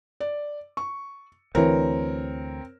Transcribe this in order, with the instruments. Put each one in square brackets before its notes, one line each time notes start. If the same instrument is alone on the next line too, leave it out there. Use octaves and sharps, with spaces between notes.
[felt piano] D5
C#6
[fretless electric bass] D2 E3 [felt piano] C4 A#4 C#5